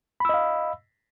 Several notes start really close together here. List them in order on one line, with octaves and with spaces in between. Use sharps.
B5 E6 D#5 F5